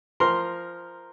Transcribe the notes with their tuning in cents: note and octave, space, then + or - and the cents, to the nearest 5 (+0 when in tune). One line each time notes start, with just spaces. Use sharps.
F3 -10 A#4 +0 C6 +0